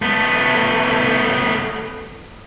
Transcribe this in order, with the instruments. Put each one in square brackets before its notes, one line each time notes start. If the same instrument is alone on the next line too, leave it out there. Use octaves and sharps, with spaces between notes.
[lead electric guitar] A3 B3